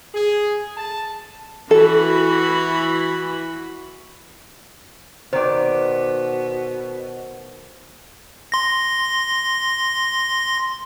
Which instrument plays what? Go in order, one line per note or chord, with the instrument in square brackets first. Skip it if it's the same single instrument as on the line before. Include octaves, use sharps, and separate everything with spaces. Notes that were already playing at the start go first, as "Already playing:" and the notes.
[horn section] G#4
A5
[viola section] E3 F#4 B5 [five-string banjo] A4
[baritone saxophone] B2 [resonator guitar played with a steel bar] D#3 D5 [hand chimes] C5
[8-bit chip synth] C6 A#6